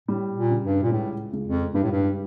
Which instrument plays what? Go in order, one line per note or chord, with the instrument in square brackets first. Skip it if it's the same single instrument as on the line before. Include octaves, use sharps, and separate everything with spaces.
[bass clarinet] A2 [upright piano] G3
[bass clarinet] A#2
[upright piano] C#3
[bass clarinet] G2
A#2
[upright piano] C#2 [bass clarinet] A2
[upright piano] C#2
[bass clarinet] F2
[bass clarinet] G2 [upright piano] G3
[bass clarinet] A2
G2